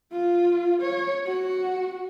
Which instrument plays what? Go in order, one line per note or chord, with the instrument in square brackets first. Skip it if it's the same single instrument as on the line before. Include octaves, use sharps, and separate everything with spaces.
[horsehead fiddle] F4
C#5
F#4